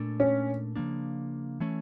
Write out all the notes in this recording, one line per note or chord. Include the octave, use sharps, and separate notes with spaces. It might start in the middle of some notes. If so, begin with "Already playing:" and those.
Already playing: A#2 A3 D4
C#4
C#3 F3 A#3 D4
E3 A3 C#4